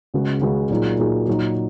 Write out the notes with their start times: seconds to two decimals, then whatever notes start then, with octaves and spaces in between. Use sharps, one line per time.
0.14 C#2 C#3 G#3 F#4
0.41 C#2 C#3 G#3 F#4
0.70 A#2 F#3 D#4 G#4
0.99 A#2 F#3 D#4 G#4
1.28 A#2 F#3 D#4